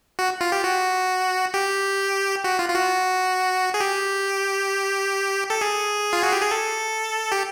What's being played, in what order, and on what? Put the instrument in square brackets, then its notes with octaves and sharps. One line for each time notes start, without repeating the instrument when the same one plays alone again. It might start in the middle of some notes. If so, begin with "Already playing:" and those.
[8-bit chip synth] F#4
F4
G4
F#4
G4
F#4
F4
F4
F#4
G#4
G4
A4
G#4
F4
F#4
G4
G#4
A4
G4